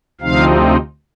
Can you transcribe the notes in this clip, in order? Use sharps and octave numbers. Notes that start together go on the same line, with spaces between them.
D2 C3 F3 C4 D#4 F5